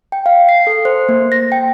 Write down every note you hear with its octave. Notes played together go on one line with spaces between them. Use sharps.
G5
F5
C7
A4
C5
A#3
A#6
G5